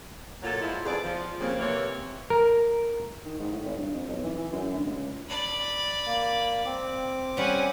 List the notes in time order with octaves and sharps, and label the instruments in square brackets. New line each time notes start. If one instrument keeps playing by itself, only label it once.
[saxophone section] A#2 F#3 F4 A4
F3 G#3 E4
F2 B3 G#4 D5
F3
C#3 G3 A#3 C4
C3 E3 A#3 C#5
[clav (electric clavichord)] A#4
[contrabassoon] D#3
G#2
A2
G#1
G2
F2
B1
E3
E3
F#2
D2
C#2
[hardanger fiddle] D5 B5
[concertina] A#3
C4 D6
[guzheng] G3 C#4 [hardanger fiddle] F#5 G#5